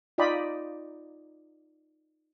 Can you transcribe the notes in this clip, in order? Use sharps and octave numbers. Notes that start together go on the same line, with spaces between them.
D#4 F4 D5 D#5 G5 B5